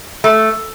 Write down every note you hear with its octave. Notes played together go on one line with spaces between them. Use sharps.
A3